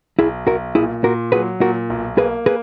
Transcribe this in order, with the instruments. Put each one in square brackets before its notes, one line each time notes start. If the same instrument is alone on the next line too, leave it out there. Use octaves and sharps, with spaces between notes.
[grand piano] B1 [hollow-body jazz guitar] E4 G#4
[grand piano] B1 [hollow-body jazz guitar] F#4 A#4
[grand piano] A#2 [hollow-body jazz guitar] E4 G#4
[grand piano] A#2 [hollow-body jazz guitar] F#4 A#4
[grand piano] F#3 [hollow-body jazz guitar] G#4 B4
[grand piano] A#2 [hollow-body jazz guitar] F#4 A#4
[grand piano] B1
[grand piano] A#3 [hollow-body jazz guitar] G#4 B4
[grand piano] A#3 [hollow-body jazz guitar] G#4 B4